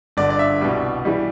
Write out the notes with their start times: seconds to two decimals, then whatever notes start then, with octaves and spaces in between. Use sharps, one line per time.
0.17 G1 G2 D3 D5
0.30 D5
0.39 E5
0.61 C2 B2 G3
1.05 E3 G3